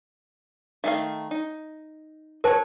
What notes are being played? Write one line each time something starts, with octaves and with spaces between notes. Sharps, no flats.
D#3 A3 E5 F5
D#4
F#4 A#4 C5 C#5 A5